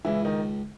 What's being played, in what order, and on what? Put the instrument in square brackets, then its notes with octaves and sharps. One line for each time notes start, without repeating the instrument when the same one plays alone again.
[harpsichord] C#2 [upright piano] E3 E4
[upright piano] D#3 D#4